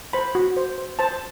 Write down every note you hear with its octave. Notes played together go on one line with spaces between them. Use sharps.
C5 B5
F#4
C5
C5
C5 A5